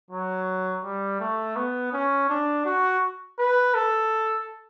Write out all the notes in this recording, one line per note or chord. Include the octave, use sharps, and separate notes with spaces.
F#3
G3
A3
B3
C#4
D4
F#4
B4
A4